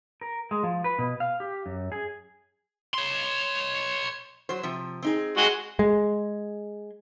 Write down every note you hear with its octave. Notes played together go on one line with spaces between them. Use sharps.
A#4
G#3
F3
B4
B2
F5
G4
F#2
G#4
C#5 C6
F#3 C5
C3 F3
C4 D#4 G#4
G#3 F#4 D#5
G#3